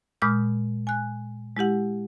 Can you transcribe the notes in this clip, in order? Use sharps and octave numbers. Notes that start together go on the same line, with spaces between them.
A#2 G#3 B5 D#6 F6 G6
G#5 F#6
G#3 E4 G4 F#5